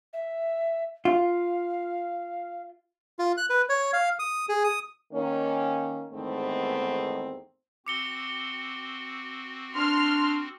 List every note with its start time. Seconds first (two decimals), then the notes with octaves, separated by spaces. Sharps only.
0.13 E5
1.05 F4 F5
3.19 F4
3.37 F#6
3.50 B4
3.69 C#5
3.93 F5
4.19 D#6
4.49 G#4
4.64 D#6
5.13 D#3 A#3 C#4
6.13 E2 G#2 D#3 A3 B3 C4
7.86 C4 F#4 D6 C#7 G7
9.75 D4 C6 F6